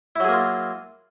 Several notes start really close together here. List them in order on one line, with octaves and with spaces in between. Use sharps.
E4 F#3 G#4 A#3 F4